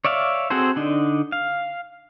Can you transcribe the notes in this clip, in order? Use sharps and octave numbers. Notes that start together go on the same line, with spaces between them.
C#5 D5 E5 F5
C4 F#4 G#4 A4 C5
D3 D4 D#4
F5